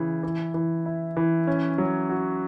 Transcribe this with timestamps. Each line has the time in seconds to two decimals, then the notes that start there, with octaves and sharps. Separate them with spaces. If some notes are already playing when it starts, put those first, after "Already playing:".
Already playing: C#3 E3
0.23 E3
0.54 E3
0.86 E4
1.17 E3
1.47 C#4
1.78 F#3
2.09 F#4